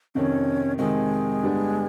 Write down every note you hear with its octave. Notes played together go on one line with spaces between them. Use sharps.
F2 C3 D#3 C#4
F2 C3 D#3 G#3
G2 D3 G3 B3 D4